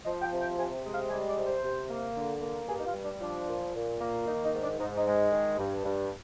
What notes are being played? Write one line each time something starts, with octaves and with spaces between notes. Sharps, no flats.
F3 D#5
G5
C3
G5
C3 G#5
G#3
F5
G3 G#5
D5
C3
C5
C3
A#3
D3
A#3
G2 G#4
D#4
F4
G3
D4
F3 D4
A#2
A#2
A#3
D#3 D#4
D#4
G#2
D4
G#2 D#4
D#4
G#3
D#3
G2
G2